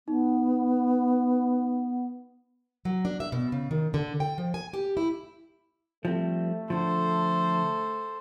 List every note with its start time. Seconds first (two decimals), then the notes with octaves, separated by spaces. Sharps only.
0.08 B3 D#4
2.85 F#3
3.05 D4
3.20 E5
3.32 B2
3.52 C#3
3.71 D#3
3.94 D3
4.20 G5
4.38 F3
4.54 G#5
4.73 G4
4.97 E4
6.05 F3 G3 A3 C4
6.70 D3 F3 A4 C5